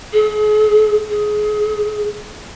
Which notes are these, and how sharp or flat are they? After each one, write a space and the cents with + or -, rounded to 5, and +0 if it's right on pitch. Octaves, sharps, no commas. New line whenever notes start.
G#4 +40
G#4 +25